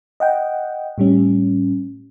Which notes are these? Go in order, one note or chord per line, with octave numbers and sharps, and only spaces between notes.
D#5 F#5 G5
A2 G3 C#4